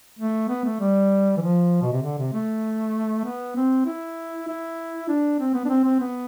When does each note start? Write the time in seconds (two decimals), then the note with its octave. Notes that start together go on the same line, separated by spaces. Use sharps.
0.19 A3
0.49 B3
0.65 A3
0.80 G3
1.37 E3
1.41 F3
1.82 B2
1.92 C3
2.03 D3
2.18 C3
2.33 A3
3.25 B3
3.56 C4
3.86 E4
4.48 E4
5.09 D4
5.39 C4
5.54 B3
5.65 D4
5.69 C4
5.85 C4
6.00 B3